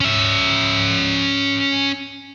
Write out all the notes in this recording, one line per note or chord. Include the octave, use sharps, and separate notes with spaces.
C#4 E5